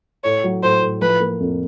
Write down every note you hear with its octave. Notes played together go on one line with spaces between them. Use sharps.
A2 C#5
F#3
A2 C5
A2
F3 B4
A#3
F2